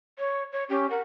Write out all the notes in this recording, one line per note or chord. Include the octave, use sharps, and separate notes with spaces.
C#5
C#5
C#4 G4
A#4 F#5